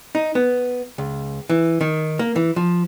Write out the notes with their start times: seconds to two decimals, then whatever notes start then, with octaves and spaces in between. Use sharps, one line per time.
0.15 D#4
0.35 B3
0.98 C#2
1.50 E3
1.81 D#3
2.19 A#3
2.36 E3
2.56 F3